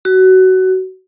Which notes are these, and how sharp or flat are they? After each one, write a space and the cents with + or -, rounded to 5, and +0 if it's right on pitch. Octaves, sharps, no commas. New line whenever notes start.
F#4 +20